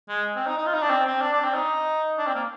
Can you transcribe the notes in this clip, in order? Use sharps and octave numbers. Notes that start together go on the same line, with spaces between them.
G#3
C4
D#4
D#4
F4
D#4
D4
C4
C4
D4
D4
C4
D#4
D4
C4
A#3